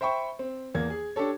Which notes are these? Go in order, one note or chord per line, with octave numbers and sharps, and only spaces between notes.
C5 E5 G5 B5 C#6
C4
E2 A#3 G#6
G#4
D4 G4 A4 C#5